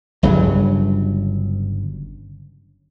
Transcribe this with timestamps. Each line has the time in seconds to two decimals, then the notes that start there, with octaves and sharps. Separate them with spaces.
0.23 G1 G2 C#3 F#3